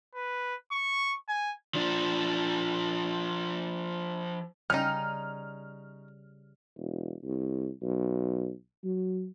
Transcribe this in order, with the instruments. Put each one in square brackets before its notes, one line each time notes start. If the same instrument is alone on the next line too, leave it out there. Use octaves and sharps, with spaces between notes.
[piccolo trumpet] B4
C#6
G#5
[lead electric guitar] F3 D4
[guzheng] C#3 G3 [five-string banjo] C#4 D#4 [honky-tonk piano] F6
[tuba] E1
C2
B1
F#3